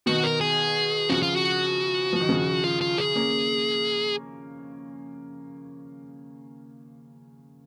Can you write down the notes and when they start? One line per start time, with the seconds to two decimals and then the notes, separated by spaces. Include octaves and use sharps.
0.06 B2 D#3 F#4
0.24 A#4
0.41 G#4
1.09 C#3 F3 F#4
1.22 F4
1.36 F#4
2.13 F3
2.20 D#3
2.29 C#3 F3
2.64 F4
2.81 F4
2.98 G#4
3.15 A#3 C#4